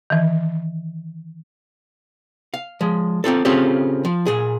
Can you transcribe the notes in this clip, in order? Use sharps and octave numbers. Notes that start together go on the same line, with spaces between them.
D#3 E3
F5
F3 G#3
A#3 C4 F4 A4
C#3 C4 C#4 F4 G4 A4
F3
A#2 G#4